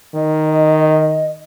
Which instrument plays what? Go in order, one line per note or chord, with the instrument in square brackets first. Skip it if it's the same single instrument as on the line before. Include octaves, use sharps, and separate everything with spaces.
[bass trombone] D#3 [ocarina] D#5